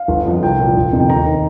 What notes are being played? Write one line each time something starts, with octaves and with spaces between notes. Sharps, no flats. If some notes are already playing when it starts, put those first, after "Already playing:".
Already playing: F5
G1
F2 F3
C2 G5
A#2 F3
G1
F2 C3 D#3
G5
D#2 A#5
D#3